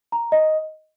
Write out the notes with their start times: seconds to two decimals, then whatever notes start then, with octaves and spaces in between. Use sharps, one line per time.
0.12 A#5
0.32 D#5